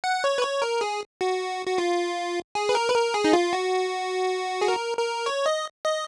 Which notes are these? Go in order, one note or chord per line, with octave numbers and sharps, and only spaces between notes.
F#5
C#5
B4
C#5
A#4
G#4
F#4
F#4
F4
G#4
B4
A#4
B4
A#4
G#4
D#4
F4
F#4
G#4
A#4
A#4
C#5
D#5
D#5